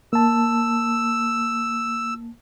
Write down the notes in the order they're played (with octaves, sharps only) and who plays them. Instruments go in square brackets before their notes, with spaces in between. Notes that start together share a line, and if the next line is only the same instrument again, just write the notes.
[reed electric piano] A#3 A5 [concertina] E6